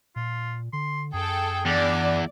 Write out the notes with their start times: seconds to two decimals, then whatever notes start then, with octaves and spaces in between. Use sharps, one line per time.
0.16 A#2 F4
0.73 D3 C6
1.13 F#2 G#4 A4 G5
1.66 E2 D4 D5